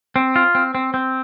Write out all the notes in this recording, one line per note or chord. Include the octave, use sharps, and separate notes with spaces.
C4
F4
C4
C4
C4